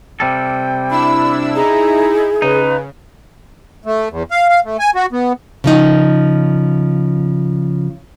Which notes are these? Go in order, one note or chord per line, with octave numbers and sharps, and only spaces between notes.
C3 G3 A4 G5
D4 E4 B5 E6
D#4 E4 G#4 A#5
C#3 D#4 B4
A3
E2
F5
F5
A3
G#5
F#4
B3
C#3 F3 D#4